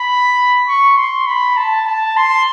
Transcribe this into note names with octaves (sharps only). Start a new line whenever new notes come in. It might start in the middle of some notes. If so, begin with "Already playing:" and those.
Already playing: B5
C#6
C6
B5
A5
A5
C6